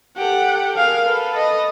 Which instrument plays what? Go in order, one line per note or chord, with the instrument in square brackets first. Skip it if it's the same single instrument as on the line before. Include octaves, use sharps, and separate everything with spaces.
[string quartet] G4 A4 [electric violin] F#5
[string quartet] G#4 A#4 [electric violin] F5
[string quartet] A4 B4
[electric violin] D#5